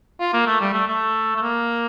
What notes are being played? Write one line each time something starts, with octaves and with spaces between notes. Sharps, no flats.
F4
A#3
A3
G3
A3
A3
A3
A#3